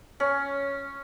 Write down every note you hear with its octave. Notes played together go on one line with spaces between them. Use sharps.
C#4